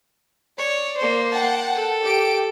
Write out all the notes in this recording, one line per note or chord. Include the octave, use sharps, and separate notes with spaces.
C#5 D5
A#3 C5
F#5 G5 A5
A4
G4 D7